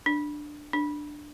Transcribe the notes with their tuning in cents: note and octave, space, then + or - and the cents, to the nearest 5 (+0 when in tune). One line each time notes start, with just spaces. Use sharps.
D4 +10
D4 +10